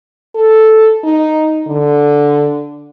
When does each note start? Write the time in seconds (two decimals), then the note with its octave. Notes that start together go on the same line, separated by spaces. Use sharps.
0.35 A4
1.04 D#4
1.67 D3